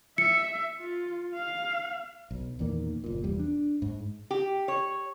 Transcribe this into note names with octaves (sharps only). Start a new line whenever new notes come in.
E5 C#7
F4
F5
B1
E2 A#2 D#3 A#3
F#1 A#2
F1 E2 G3
D4
G#2
G4
C#5